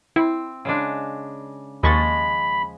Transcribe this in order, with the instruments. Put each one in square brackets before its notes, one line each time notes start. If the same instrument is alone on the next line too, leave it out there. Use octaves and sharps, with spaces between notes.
[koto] C4 [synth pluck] E4
[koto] C#3 G#3 D4
[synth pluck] D#2 C#6 A6 [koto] F3 G#3 D#5 [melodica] B5